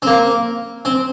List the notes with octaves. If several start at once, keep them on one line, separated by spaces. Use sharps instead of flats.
C4
A#3
C4